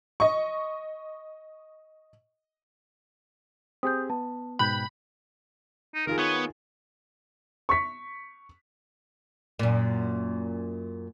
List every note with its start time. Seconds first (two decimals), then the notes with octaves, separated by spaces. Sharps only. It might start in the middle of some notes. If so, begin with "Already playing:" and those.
0.20 D#5 C#6
3.83 C4 G4 G#4 D#6 G6
4.10 B3 A5
4.59 G#2 B2 G5 B5 F#6 G6
5.95 D#4
6.07 D#3 F4 G#4 A#4
6.19 B3 C#5
7.69 C#6 B6
9.59 F#2 A#2